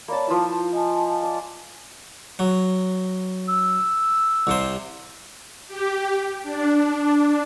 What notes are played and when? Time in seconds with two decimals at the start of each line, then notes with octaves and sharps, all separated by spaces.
0.08 A#3 C#5 D5 A5 B5
0.27 F3 E4 B4 A5 E6
0.73 D#5 G#5 A5
1.23 D5
2.39 F#3
3.49 E6
4.47 C2 C3 C5
5.67 G4
6.43 D4
6.97 D4